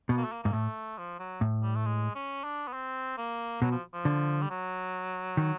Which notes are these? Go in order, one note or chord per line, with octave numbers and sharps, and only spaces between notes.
B2 B3
A#3
A3
A#3
G#2 A#3
A2 A3
F3
F#3
A2
G3
A3
G#3
C#4
D4
B3
C4
A#3
B2 F#3
F3
F3
D3
G3
F#3
D#3